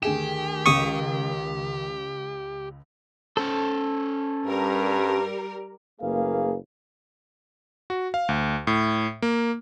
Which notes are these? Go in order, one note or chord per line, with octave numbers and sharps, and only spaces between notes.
D2 D#3 G4 G#4 E7
C#2 C#4 C#6 D#6
C#4 A4 C5 A5
G2 G3 A#4
F#1 A3 A#3 G#4 B4 F5
F#4
F5
D2
A2
A#3